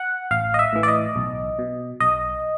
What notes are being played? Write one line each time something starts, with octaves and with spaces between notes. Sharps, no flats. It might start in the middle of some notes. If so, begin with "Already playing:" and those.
Already playing: F#5
A1 F5
D#5
E5
A2 E3
D5
D#5
B1
B2
B1 D#5